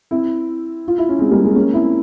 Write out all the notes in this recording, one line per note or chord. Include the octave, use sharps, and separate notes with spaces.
C4 E4
F4
E4
C#4
G#3 C4
G3 A#3
G#3 C4
A#3 C#4
C4 E4